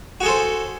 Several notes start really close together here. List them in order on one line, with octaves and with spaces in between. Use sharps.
F#4 G#4 A4 C5